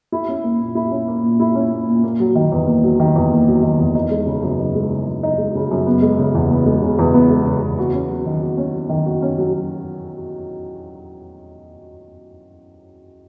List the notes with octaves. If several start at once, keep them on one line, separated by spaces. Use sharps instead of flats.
E4
C#4
A#3
A#2
E4
C#4
A#3
A#2
E4
C#4
A#3
A#2
A#3
F#3
D#3
E2
A#3
F#3
D#3
E2
A#3
F#3
D#3
E2
D#4
G#3
C#3
F#2
D#4
G#3
C#3
F#2
D#4
G#3
C#3
F#2
B3
G#3
C#3
E2
B3
G#3
C#3
E2
B3
G#3
C#3
E2
F#4
C#4
F#3
D#3
F#4
C#4
F#3
D#3
F#4
C#4
F#3